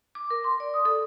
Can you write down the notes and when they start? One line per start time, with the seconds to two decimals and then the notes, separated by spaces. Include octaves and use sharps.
0.15 D6
0.30 A#4
0.44 C6
0.60 D5
0.74 D#6
0.85 A4